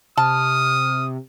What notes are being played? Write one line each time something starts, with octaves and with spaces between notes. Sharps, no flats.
C3 A5 D#6 F6